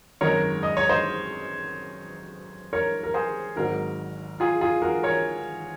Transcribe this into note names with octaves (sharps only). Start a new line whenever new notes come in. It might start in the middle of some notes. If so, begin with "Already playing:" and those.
G#1 F#2 D#3 G#3 A#4 C#5
D#5
C#5
C5 D#5
A#4 C#5
A#4
G#4 C5
G#1 G#2 D#3 F#3 F#4 A#4
F4 G#4
F4 G#4
F#4 A#4
A#4 C#5